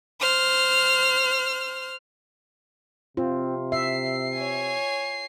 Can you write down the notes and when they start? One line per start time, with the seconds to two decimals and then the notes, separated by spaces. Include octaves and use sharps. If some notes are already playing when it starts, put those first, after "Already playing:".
0.20 C5 F6
3.17 C3 C4 F4
3.72 E5 C7
4.34 C#5 G#5